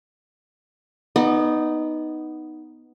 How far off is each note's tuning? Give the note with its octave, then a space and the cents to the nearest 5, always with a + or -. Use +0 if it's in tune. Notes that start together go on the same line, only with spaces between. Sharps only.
B3 +0 D#4 +0 D5 +40